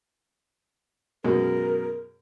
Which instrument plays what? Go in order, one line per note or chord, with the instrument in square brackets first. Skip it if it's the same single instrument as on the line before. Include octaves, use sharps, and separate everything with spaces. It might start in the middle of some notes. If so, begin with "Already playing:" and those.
[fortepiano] F#2 B2 G#3 [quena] A#4